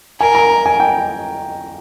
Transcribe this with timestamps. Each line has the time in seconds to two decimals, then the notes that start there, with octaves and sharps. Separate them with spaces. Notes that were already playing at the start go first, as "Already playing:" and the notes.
0.20 A#4 G#5
0.35 A#5
0.66 G#5
0.80 G5